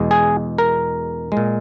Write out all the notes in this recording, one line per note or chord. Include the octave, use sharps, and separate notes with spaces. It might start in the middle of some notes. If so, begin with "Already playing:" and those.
Already playing: E2 B2 G#3
G#4
A#4
G#3
A#2